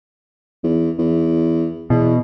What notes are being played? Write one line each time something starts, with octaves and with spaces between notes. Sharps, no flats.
E2
E2
E2 B2